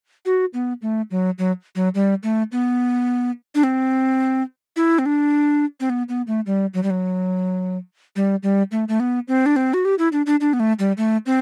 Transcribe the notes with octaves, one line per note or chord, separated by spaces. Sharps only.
F#4
B3
A3
F#3
F#3
F#3
G3
A3
B3
D4
C4
E4
C4
D4
C4
B3
B3
A3
G3
F#3
G3
F#3
G3
G3
A3
A3
B3
C4
D4
C4
F#4
G4
E4
D4
D4
D4
B3
A3
G3
A3
C4